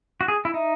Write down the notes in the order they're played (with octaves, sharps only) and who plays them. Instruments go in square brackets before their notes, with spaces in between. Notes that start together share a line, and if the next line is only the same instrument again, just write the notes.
[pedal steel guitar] F#4
G#4
E4
[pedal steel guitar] D#4 [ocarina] E5